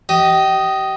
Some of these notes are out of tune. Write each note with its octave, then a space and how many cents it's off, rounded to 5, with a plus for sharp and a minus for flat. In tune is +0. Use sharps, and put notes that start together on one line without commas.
G4 -30 D#5 +0